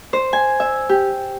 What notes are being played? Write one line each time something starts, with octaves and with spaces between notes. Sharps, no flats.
C5
G#5
E5
G4